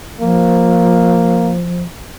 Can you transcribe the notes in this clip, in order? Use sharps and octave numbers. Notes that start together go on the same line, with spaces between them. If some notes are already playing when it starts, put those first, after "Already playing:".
F3 A#3